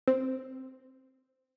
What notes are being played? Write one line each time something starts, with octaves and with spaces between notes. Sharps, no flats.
C4